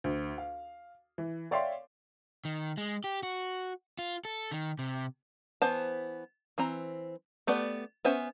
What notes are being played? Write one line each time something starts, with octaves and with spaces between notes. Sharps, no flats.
D2
F5
E3
C#5 D5 E5 F5 G5 C6
D#3
G#3
G4
F#4
F4
A4
D#3
C3
E3 B3 C5 A5
E3 C4 A#5
A3 B3 G4 B4 D5
B3 C#4 C5 E5 G#5